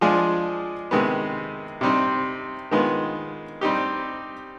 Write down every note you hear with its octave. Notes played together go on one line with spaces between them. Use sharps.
F3 G#3 D4 F4 G#4
C3 D#3 G#3 B3
C3 G3 C4 D#4
D#3 G#3 B3 F4
G3 C4 D#4 G4